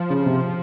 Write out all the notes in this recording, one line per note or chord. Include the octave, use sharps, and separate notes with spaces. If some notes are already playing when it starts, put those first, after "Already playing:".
Already playing: F3
C#3
C3